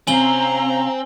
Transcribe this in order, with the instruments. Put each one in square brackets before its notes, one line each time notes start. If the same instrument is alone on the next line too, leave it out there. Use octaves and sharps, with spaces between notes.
[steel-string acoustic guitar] C3 C#4 [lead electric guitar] C4 [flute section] F5 A#5 [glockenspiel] G#5 F#7 G7